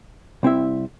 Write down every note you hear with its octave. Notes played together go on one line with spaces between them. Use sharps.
C2 C4 E4 E5